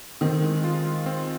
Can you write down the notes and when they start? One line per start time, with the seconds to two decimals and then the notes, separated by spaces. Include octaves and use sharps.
0.21 D#3 C4
0.42 G#3
0.64 F4
0.85 G#3
1.06 C4